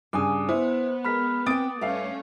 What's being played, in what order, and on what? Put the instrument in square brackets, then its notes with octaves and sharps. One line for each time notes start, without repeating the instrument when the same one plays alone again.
[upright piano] G2 C#3 [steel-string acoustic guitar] G#5 [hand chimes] D6 D#6
[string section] B3 [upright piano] E4 [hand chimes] C5
[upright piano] G#3 A#4 [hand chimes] B5 F6 B6
[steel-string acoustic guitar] C4 G5 [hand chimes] D6 [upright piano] D#6 A6 D7
[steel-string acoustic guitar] G2 [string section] A3 C#4 [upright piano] E5 F5